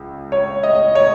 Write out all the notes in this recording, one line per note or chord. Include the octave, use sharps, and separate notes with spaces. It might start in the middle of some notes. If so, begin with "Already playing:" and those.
Already playing: C#2
C#5
D#5
C#5